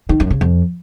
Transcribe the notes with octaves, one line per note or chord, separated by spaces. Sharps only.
D#3
F#2
C#3
F2